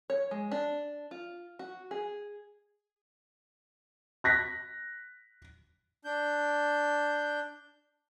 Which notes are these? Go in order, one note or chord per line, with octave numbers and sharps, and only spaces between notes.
C#5
G#3
D4
F4
F#4
G#4
F#6 A#6 B6
D4 G6